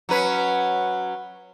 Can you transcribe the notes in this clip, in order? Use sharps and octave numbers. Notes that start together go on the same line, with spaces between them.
F#3 C#4 B4